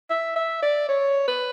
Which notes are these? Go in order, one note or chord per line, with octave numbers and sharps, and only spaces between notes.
E5
E5
D5
C#5
B4